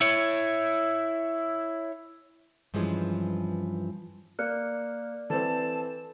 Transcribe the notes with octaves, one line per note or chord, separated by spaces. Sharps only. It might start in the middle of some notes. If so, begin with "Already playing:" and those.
E4 C#5
G2 E3 F3 G3 G#3 C#4
A#3 D5 F6 F#6 C#7
E3 C4 A4 B4 A5